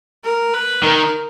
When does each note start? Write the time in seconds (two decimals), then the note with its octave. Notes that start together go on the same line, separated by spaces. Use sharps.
0.24 A#4
0.54 B4
0.83 D#3 A#4